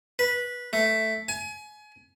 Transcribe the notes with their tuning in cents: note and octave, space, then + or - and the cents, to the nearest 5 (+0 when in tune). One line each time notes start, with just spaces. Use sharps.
B4 -15
A3 +0
G#5 +30